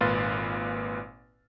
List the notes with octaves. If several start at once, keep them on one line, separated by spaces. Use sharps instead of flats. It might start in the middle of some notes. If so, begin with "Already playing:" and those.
G#1 A#2 B4 F5 C6 A6